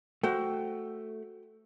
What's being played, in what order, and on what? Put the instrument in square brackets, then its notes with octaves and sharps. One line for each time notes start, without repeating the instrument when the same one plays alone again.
[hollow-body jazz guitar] A3 [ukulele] F#4 C5 G5